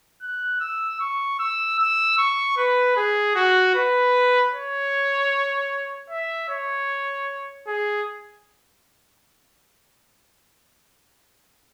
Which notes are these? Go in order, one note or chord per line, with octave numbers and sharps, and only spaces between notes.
F#6
E6
C#6
E6
E6
C#6
B4
G#4
F#4
B4
C#5
E5
C#5
G#4